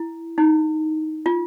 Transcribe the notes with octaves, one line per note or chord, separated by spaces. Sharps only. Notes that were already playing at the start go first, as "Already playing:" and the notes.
Already playing: E4
D#4
F4